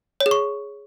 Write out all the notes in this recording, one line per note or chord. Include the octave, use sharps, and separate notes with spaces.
C#5
G#4
C#6